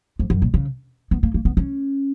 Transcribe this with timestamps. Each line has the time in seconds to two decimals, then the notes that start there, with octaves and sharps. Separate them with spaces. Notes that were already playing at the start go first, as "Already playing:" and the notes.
0.19 F2
0.30 F#2
0.42 A#2
0.54 C#3
1.11 B3
1.23 A#3
1.34 A#3
1.45 B3
1.57 C#4